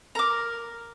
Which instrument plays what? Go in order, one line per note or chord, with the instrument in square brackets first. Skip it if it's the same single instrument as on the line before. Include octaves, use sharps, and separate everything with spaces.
[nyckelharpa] A#4 [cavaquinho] A#5 D6